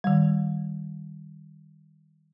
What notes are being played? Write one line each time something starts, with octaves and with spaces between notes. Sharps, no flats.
D#3 G3